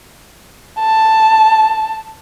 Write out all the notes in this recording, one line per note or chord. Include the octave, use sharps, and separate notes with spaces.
A5